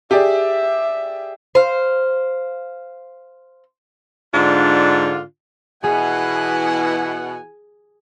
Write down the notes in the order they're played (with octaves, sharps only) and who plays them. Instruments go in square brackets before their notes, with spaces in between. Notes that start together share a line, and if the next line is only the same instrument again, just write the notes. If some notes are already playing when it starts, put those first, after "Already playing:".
[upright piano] G4 G#4 D5 [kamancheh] E5
[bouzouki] C5 F5
[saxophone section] G#2 D3 D4 F4
[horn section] B2 F#5 [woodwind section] E3 E4 [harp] G#4 [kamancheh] G#5